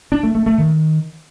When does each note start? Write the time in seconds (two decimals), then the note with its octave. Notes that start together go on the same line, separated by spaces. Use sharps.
0.12 D4
0.23 A3
0.35 A3
0.46 A3
0.58 D#3